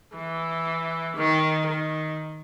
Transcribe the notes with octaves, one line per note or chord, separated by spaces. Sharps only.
E3
D#3
D#3